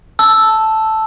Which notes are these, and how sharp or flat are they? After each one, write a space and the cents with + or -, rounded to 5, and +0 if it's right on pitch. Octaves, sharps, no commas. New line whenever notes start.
A5 +0 E6 +0